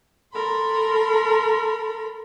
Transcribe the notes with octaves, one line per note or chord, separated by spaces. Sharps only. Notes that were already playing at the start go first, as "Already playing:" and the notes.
A4 A#4 B5 C6